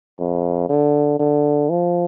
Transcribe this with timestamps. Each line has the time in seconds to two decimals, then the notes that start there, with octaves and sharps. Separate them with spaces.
0.19 F2
0.69 D3
1.19 D3
1.70 F3